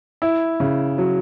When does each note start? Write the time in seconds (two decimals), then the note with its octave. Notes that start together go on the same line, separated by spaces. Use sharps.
0.22 E4
0.60 C#3
0.98 F#3